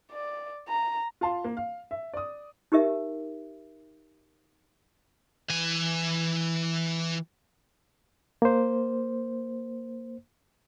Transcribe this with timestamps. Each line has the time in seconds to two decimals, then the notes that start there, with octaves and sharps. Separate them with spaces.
0.12 D5
0.68 A#5
1.21 F4 F5 A5 C6
1.44 A#3
1.57 F5
1.91 E5
2.14 D5 D#6
2.72 D#4 G4 A#4 E5
5.49 E3 G#5
8.42 A#3 C5